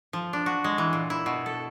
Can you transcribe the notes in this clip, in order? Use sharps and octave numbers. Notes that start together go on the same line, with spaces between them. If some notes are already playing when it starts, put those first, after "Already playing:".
F3
D4
F#4
G#3
E3
A#2
E4
B2
A4